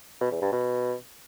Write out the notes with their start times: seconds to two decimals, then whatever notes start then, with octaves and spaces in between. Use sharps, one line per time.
0.21 B2
0.31 E2
0.42 G2
0.52 B2